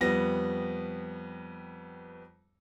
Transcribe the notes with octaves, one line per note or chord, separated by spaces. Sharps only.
F2 G3 B3 A#6